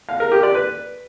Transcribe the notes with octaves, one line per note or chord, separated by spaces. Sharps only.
F5
A#4
G4
D5
B4